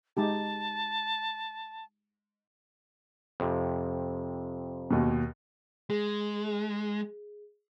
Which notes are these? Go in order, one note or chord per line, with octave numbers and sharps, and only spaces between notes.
G#3 D#4 G4 A5
F2 C3
D#2 B2
G#3 G#4